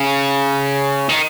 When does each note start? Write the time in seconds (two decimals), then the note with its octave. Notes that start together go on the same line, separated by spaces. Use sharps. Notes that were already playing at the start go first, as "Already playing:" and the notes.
Already playing: C#3
1.09 D#3